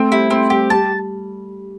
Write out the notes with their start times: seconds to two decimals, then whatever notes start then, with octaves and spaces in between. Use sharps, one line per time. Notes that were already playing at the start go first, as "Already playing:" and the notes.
Already playing: A3 C4
0.11 G3 E4
0.30 A3 C4
0.50 G3 G4
0.70 G3 A5